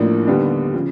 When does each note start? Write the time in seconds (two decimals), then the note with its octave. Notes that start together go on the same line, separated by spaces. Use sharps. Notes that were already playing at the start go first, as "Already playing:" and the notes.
Already playing: A1 A2 F3 A#3 D4
0.27 D#2 D3 G3 B3 D4
0.74 C#3 F3